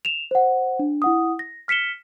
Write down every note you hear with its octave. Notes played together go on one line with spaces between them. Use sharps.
E7 F7
C5 F#5
D4
E4 F#5 D#6
A#6
F6 B6 C#7 E7 G7